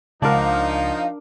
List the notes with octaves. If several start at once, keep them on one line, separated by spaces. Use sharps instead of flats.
C#2 F3 D4 D#4 A#4 F5 F#5